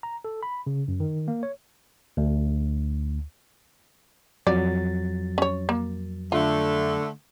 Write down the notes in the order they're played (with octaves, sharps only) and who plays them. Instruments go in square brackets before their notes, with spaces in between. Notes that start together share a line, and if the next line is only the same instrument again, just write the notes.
[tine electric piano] A#5
A4
B5
C#3
F#2
D#3
A#3
C#5
D2
[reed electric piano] F2 F#3 A6 [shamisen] D5
[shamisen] C#4 C#5
A#3
[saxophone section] D3 A3 [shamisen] F4